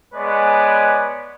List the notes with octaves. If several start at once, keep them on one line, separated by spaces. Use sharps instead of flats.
G#3 B3 B4 C#5 D5 G#5